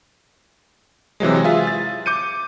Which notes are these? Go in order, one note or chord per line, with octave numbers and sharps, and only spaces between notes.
C3 E3 F#3 G#3
F4 G#4 E5
A6
D6 G6 C#7 D#7